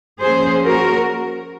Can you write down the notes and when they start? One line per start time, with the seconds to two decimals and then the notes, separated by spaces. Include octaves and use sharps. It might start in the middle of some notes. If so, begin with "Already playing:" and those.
0.20 F3 A#3 C#4 G#4 C5
0.65 F#4 A#4